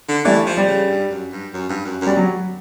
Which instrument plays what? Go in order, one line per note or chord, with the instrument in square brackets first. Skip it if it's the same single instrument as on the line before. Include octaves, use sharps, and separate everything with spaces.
[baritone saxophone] D3
[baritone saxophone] E3 [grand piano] G3 A3
[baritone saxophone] F3
[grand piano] G3
[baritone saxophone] C#3
G2
F#2
G2
F#2
G2
F#2
[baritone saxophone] F#2 [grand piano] G3
[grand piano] F#3